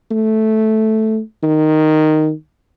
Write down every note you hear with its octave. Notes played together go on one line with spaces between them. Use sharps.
A3
D#3